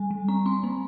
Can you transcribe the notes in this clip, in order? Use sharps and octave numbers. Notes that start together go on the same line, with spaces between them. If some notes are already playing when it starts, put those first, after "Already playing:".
Already playing: G3 G#5
G3
C4 A#5
C4 C6
A#3